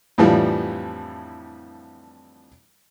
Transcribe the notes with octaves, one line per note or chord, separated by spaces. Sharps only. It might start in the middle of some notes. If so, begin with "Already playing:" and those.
F2 A2 D3 E3 F3 G3